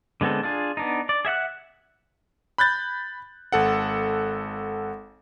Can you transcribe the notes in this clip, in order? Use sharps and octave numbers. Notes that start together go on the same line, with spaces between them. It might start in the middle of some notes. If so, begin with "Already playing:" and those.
D3 G#3 B3 C4 A4
D4 F4 G#4
B3 D4 D#4
D5
G#4 E5 F#5 F#6
B5 F#6 G6 A6
G#1 A4 F#5